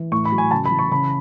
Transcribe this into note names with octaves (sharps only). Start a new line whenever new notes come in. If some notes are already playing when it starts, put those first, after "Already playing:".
Already playing: E3
A2 C#6
B5
F#3
G#5
C#3 A5
B5
E3
C#6
C#3 B5